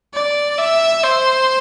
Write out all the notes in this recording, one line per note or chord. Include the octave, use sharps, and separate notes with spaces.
D5
E5
C5